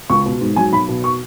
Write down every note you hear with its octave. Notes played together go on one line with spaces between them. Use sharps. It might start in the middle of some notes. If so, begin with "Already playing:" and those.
C#2 C#6
B2
G#2
F#3 G#5
B1 B5
B2
C#6